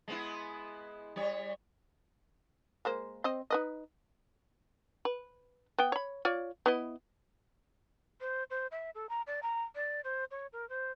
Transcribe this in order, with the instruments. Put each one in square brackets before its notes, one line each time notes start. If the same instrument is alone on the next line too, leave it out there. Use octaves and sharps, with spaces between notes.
[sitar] G#3 B3 E4
G3 C#5
[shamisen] G#3 A#3 C5
C4 C5 D#5
D#4 B4 D#5
B4
B3 G5
C#5 B5
F4 C#5 D5
B3 E4 D#5
[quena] C5
C5
E5
A4
A#5
D5
A#5
D5
C5
C#5
A#4
C5